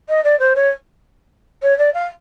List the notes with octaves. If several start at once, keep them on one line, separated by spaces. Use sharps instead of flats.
D#5
D5
C5
C#5
C#5
D5
F5